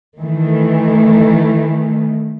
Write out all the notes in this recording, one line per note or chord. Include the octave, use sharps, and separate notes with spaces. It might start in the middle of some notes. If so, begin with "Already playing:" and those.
D#3 E3 A3